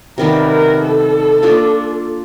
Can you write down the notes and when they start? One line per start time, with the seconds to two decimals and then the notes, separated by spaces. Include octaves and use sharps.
0.18 C3 D#3 G3 B3 A#4
0.49 A#4
0.81 A4
1.43 A#3 D4 F4